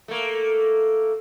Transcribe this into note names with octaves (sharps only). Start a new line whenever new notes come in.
A3 A#3